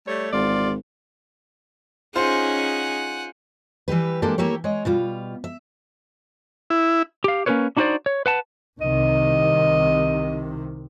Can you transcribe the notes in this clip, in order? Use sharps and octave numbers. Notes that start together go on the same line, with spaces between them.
G3 A3 C#5
G#1 E2 F4 D5
C#4 D#4 F4 G#4 C5 F#5 G#5
E3 G3 G4 B4
G#3 A#3 D4 G4 A4
A3 A#3 E4 G4 C#5
G#3 C#5 D#5
B2 G3 F4
E5
E4
G4 F5
A#3 C#4 F4 A#4 B4 C#5
D4 D#4 F#4 G4 C5 D5
C#5
B4 F#5 A5
C2 C3 D#3 D#5